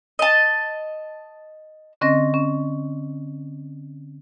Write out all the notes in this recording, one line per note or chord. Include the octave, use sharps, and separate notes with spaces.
D#5 A5
D3 C4 C#4 D#5 A#6
C#4